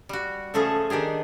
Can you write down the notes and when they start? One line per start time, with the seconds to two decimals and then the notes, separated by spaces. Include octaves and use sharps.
0.09 G3 F#4
0.54 C#3 F3 A3 C#4 G#4 A4
0.90 D#3 D4 G4 G#4